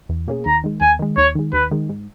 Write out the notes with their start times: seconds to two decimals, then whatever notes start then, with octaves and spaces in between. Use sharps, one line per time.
0.09 E2
0.28 B2 A#3 C#4 G#4
0.46 D#2 A#5
0.64 D#3 G#3
0.81 D#2 G#5
0.99 D#3 G#3
1.17 D#2 C#5
1.35 D#3 G#3
1.53 D#2 B4
1.71 D#3 G#3
1.89 G#2